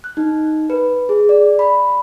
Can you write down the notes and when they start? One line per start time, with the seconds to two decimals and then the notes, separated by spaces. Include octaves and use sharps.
0.04 F#6
0.17 D#4
0.70 B4
1.09 G#4
1.29 D5
1.59 B5